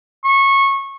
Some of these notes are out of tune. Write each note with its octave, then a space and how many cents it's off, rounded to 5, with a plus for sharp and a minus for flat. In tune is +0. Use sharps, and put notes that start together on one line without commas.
C#6 -20